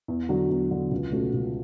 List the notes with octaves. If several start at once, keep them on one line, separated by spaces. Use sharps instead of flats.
E2
D3 F#3
E2
D3 F#3
C#2
B2 A3 C#4 F#4
C#2